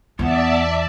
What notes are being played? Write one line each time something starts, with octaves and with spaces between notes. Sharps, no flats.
E2 B3 D5 E5 A5